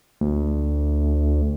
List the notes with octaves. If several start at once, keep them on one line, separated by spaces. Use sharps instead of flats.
D2